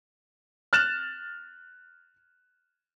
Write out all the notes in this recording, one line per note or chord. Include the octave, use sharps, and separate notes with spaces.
F6 F#6 A6 E7